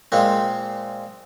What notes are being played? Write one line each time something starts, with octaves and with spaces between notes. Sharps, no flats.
A#2 G#3 C4